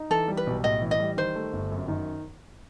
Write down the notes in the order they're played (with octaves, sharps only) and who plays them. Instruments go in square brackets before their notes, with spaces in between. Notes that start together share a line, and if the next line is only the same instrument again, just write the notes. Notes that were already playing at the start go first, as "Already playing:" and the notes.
Already playing: [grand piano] D#4
[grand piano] E3 [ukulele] A4
[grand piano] G3
[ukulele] B4
[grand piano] B1
[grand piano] A2 [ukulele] D#5
[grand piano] E3
[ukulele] D#5
[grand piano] G3
[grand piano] D#3 [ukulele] C5
[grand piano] A3
G1
F#2
D#3